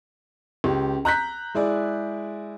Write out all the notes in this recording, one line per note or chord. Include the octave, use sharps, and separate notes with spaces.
C#2 G4
A#5 F#6 G6 B6
G#3 E4 G#4 D5